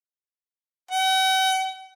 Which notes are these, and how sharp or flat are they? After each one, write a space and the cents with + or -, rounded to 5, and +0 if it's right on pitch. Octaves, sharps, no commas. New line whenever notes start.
F#5 +45